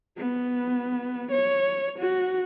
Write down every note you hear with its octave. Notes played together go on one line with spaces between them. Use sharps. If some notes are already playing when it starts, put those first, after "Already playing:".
B3
C#5
F#4